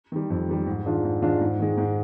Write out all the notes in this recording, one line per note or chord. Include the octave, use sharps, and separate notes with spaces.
D#3 G3
F2
D#3 G3
G#2
D#3 G#3 D4 F4
G#2
D#3 G#3 D4 F4
G#2
D#3 G#3
G#2